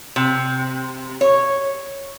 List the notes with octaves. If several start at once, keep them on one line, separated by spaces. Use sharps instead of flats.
C3
C#5